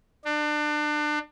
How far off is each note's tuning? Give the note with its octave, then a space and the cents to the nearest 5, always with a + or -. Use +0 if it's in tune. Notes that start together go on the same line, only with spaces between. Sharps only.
D4 +30